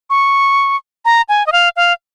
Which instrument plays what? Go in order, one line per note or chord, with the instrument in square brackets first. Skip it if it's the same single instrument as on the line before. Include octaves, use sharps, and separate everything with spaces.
[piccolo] C#6
A#5
G#5
D#5
F5
F5